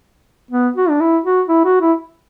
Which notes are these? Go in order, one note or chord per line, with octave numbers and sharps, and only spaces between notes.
B3
F#4
D4
E4
F#4
E4
F#4
E4